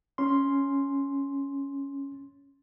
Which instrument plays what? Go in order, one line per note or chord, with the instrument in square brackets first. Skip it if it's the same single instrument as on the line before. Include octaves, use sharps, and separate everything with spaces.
[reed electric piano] C#4 C6